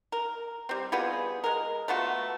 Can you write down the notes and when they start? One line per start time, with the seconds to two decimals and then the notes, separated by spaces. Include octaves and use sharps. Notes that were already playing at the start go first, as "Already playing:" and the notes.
0.12 A#4
0.69 G3 C4
0.92 G3 B3 F4 G#4
1.44 G#3 A#4
1.88 A3 B3 F4 F#4